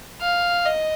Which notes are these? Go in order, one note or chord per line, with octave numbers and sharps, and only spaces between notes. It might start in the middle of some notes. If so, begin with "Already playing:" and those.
F5
D#5